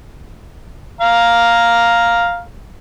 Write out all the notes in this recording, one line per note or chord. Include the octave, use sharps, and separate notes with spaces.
F5 A#5